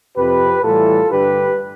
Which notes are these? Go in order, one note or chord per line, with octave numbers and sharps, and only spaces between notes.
F2 C3 F3 G4 B4
A2 E3 G3 F4 A4
G2 D3 G3 G4 B4